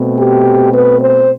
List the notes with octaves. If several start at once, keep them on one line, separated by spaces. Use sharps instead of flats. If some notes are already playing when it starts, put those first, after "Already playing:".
Already playing: B2 A3 C4
G4
B4
C5